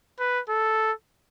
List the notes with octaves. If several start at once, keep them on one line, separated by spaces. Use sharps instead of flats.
B4
A4